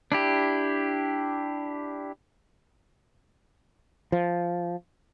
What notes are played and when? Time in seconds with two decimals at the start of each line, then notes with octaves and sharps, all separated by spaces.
0.12 D4 E4 G4
4.12 F3